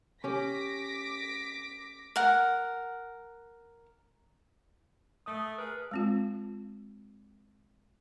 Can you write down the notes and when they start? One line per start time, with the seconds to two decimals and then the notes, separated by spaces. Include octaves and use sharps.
0.24 C#4 G4 D6 A#6 B6
2.16 A#4 F#5
5.26 A3 D#6
5.58 G#4 A#4 B4
5.91 G#3 C4 F4